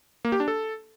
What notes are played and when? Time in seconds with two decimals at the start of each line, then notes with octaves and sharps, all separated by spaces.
0.25 A#3
0.32 G4
0.40 D4
0.48 A4